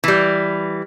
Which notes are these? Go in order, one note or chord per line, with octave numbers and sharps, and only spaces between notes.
E3 G3